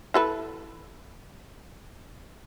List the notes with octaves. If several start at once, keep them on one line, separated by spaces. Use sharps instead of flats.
E4 A4 B4